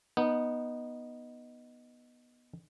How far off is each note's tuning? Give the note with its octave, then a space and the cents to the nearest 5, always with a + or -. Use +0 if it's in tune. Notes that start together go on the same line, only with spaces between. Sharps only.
B3 -15 D#4 -5